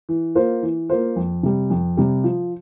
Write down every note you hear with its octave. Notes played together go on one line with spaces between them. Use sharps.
E3
A#3 F4 C5
E3
A#3 F4 C5
F2
C3 G3
F2
C3 G3
F3